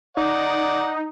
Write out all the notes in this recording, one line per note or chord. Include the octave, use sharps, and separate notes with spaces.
D#4 D5 F#5